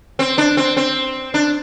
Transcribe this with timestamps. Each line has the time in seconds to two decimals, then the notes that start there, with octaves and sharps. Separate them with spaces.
0.19 C4
0.38 D4
0.57 C4
0.77 C4
1.34 D4